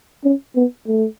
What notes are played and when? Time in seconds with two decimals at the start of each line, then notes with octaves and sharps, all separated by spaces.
0.24 C#4
0.56 B3
0.87 A3